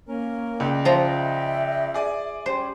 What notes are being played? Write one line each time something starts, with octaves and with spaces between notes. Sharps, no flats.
A#3 C#4 A#4
C#2 D5 D#5 G5
F3 E5 A#5
G#4 D5 G#5
G3 C#4 C5